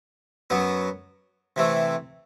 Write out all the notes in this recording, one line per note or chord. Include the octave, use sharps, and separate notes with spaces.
F#2 F#3 B3
C3 E3 A3